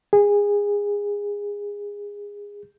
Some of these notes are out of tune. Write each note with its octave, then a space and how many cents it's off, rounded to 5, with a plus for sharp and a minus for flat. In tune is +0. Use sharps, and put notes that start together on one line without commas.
G#4 -20